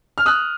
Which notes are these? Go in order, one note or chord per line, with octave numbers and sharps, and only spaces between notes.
F6
D#6 F#6